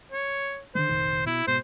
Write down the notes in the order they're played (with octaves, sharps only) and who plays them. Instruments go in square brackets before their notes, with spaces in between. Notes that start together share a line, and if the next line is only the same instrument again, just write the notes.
[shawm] C#5
[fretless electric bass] D3 D#3 G#3 [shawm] C5
[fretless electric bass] F1 A#1 D#3
[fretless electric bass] B2 [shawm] E4
[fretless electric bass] G#2 B2 [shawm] C5